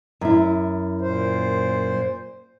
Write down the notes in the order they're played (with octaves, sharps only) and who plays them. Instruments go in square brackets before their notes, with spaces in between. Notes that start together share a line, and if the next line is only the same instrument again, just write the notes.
[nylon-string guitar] F#2 E4
[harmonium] A#2 C5